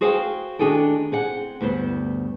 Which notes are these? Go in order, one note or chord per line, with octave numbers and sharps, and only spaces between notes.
F#4 G#4 C5 F5 G5
D#3 D4 F#4 G#4 A4 G5
C4 G#4 F#5
D2 G2 B3 C5